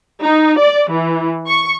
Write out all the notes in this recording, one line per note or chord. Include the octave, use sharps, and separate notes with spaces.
D#4
D5
E3
C#6